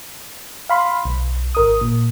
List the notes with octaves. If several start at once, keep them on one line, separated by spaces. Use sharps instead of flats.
F5 B5 C6
B1
G#1 A#4 D#6
A#2